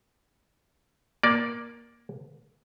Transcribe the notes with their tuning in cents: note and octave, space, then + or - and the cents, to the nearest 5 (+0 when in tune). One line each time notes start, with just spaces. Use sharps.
A#3 +15 D5 +0